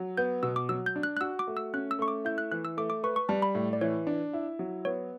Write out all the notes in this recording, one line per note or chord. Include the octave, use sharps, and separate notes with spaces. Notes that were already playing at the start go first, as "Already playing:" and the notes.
Already playing: F#3
B3 G6
B2 E6
D6
F#3 E6
G6
D4
F#6
F#6
F#4 E6
D6
A3
E6
C#4 F#6
E6
A3 C#6
D6
E4 G6
F#6
E3 F#6
E6
A3 D6
D6
B4 C#6
C#6
G3 A5
B5
A2
D5
E3 C#5
D4
E4
F#3
B3 C#5